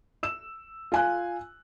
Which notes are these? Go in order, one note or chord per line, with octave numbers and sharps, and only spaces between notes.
E6 E7
F4 G#5 F#6